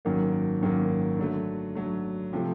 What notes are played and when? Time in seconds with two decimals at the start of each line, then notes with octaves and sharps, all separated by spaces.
0.05 G#1 F#2 D#3 F#3 A#3
0.61 G#1 F#2 D#3 F#3 A#3
1.19 D3 F#3 A3
1.75 D3 F#3 A3
2.33 C3 F3 A3